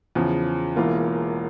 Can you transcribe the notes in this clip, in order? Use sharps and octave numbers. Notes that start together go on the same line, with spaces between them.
E2 C#3 F3
E1 E2 E3 A#3 F4